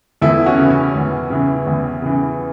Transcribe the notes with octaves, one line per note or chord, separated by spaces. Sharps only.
E2 E4 A4
C#4 F#4
C#3 E3
C#4
E2
C#3 E3
E2
C#3 E3